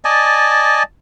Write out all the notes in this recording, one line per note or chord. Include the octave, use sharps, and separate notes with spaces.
D5 D#5 G#5 A5